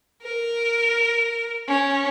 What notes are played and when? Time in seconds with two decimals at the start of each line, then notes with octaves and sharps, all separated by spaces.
0.23 A#4
1.68 C#4